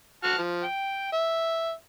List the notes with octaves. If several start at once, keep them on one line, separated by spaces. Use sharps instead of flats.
F#4 A5 F6
F3
G5
E5